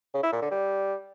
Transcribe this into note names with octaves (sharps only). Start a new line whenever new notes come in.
C#3
E4
A#2
D3
G3